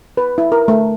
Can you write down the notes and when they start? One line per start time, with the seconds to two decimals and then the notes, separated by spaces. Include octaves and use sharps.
0.17 B4
0.38 E4
0.52 A#4
0.68 A3